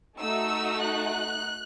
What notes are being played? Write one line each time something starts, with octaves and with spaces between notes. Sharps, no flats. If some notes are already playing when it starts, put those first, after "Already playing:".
A3 D#4 F#4 E6
F#6